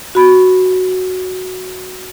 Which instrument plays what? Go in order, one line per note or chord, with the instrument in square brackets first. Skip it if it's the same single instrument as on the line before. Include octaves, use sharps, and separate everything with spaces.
[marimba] F#4 B5